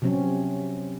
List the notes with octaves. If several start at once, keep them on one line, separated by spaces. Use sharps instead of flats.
C3 F3 F#3 C4 C#4